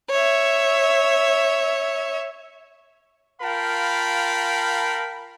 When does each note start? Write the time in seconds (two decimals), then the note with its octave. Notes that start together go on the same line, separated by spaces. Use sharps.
0.10 C#5 E5
3.41 F4 A#4 F5 G5 A5 B5